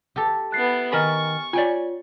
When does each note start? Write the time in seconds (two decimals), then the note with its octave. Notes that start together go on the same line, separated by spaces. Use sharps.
0.16 G4 A4
0.52 B3 E4 F#6 A6 C7
0.92 D#3 A#4 G#5 B5 C#6 F6 A6
1.53 F4 C#5 D5 G5 G#5